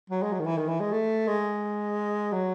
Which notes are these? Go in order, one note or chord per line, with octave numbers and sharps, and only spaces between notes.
F#3
G#3
F#3
D#3
E3
D#3
E3
G#3
A3
G#3
F#3